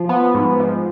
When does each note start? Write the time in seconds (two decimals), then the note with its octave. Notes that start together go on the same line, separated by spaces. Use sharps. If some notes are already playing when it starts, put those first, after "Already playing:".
Already playing: F3
0.09 B3
0.35 G#2
0.60 F3